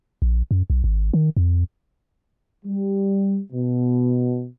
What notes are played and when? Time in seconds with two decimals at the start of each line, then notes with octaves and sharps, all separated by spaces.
0.22 A#1
0.51 F#2
0.70 B1
0.84 G#1
1.14 D#3
1.37 F2
2.66 G3
3.53 B2